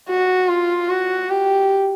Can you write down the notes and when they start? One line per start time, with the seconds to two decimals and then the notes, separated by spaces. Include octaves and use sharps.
0.09 F#4
0.49 F4
0.89 F#4
1.30 G4